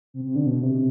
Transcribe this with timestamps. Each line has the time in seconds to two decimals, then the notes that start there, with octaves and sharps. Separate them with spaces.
0.14 C3
0.25 C3
0.36 D3
0.46 B2
0.63 C3